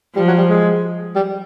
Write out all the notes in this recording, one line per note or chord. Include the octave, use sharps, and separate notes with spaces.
F3 G3
F#3
G3
G#3
G3